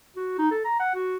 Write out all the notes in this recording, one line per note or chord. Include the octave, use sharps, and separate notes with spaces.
F#4
D#4
A4
A#5
F#5
F#4